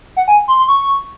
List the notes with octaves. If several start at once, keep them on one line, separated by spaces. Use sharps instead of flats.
F#5
G#5
C6
C6
C#6